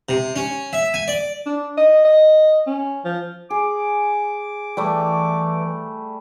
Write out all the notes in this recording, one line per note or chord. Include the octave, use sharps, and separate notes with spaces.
C3
C#4
E5
G#5
D5
D4
D#5
D#5
C#4
F3
G#4 D6
E3 G3 A3